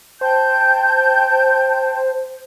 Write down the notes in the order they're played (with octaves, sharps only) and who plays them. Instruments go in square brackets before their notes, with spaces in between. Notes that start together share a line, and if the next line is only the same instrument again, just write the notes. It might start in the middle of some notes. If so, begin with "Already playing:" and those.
[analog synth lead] C5 [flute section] G5 A5 G6